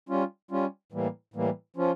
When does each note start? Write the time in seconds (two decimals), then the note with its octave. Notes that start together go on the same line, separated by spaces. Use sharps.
0.09 G3 C#4 F4
0.51 G3 C#4 F4
0.92 A2 E3 G3 A#3
1.34 A2 E3 G3 A#3
1.76 F3 C#4 F4